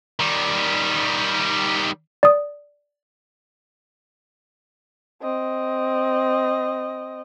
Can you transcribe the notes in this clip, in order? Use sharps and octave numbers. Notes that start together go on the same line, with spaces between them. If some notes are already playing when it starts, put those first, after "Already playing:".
D#3 G3
D5 D#6
C4 D#5